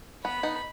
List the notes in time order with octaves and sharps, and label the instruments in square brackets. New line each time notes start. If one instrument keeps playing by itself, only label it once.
[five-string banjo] B3 [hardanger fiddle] B5
[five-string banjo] B3 D#4